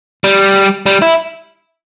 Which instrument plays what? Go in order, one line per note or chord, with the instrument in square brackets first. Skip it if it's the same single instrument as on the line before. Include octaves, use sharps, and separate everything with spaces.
[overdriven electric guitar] G3
G3
E4